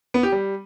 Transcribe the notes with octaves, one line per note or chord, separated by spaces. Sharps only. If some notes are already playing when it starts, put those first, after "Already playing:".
B3
G4
G3